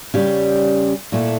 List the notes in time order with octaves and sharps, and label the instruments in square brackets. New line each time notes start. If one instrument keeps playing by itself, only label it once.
[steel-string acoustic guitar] C#3 G3 C#4 G4 D5
A#2 A3 E4 A4